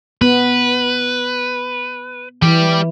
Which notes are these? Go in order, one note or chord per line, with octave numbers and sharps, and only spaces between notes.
B3 B4
E3 G3 G4